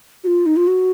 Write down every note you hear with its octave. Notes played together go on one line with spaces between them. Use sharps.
F#4
F4
D#4
F4
F#4